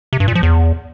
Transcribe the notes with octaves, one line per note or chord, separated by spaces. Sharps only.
C3
G2
A#2
F3
E2